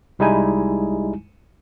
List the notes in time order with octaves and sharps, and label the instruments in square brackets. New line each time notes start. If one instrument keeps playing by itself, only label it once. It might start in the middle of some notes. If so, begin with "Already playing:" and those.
[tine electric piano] C2 G3 G#3 D#4 E4 G#5